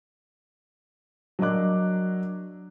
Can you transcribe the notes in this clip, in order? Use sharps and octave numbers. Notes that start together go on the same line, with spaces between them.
F#3 D4 A#4 D#5 D6 F#6